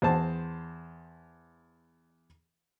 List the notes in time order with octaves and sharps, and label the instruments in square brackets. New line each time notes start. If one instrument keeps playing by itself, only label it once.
[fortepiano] E2 C5 A5